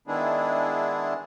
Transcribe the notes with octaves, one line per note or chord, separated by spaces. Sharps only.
D#3 G#3 B3 D4 E4 G#4